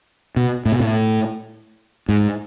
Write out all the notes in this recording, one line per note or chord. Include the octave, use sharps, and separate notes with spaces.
B2
A2
B2
A2
G#2